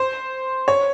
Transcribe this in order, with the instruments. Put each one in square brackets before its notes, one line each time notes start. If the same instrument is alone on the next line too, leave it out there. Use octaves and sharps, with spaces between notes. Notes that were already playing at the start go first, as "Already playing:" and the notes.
Already playing: [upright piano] C5
C#5